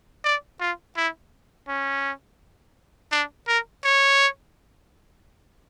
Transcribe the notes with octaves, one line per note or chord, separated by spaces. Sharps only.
D5
F4
E4
C#4
D4
A#4
C#5